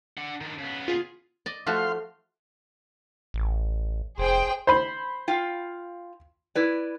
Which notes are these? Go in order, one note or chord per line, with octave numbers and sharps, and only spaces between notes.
D4 F#5
D#3 D4
C#3 B3
F4 G#4
D5 D#5
F3 A3 F#4 F5 C6
A1
F1 G#4 C5 G5
C5 B5
F4 F5 G5
E4 B4 D5